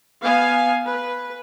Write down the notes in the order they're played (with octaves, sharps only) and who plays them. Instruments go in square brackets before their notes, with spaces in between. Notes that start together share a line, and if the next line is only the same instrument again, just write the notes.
[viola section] B3 F5 G#5
B4